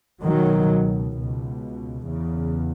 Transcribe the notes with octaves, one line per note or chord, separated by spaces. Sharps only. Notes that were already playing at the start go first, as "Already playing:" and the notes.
C#2 B2 D#3 F#3
C#2 B2
E2 C#3